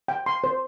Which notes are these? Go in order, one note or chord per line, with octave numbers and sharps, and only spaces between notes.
G5
C6
C5